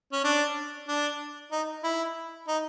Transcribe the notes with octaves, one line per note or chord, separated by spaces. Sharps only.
C#4
D4
D4
D#4
E4
D#4